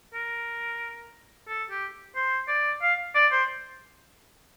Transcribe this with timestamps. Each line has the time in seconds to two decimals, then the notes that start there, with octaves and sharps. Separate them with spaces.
0.14 A#4
1.48 A4
1.70 G4
2.15 C5
2.48 D5
2.82 F5
3.15 D5
3.31 C5